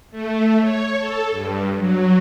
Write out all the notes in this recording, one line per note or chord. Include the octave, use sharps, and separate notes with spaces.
A3
C#5
A4
G2
F#3